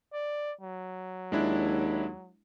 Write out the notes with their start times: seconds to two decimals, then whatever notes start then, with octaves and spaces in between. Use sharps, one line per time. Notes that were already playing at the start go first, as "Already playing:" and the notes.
0.13 D5
0.61 F#3
1.32 D#2 G#3 D4 E4